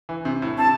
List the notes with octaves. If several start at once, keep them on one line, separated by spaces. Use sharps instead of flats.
E3
C3
A2
C3 A5